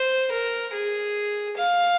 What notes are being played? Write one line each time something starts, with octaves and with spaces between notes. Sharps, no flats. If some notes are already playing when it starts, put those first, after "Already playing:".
Already playing: C5
A#4
G#4
F5